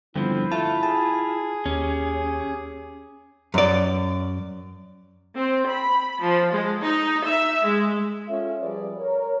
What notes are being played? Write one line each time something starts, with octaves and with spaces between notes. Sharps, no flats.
G2 D3 F3 B3 C4 E4
A3 F4 A5
G#4 A5
D#2 C#4 G4
F#2 D5
C4
B5
F3
G#3
D#4
E5
G#3
C#4 F4 A4 E5
F3 G3 G#4 B4 D5
A#4 C#5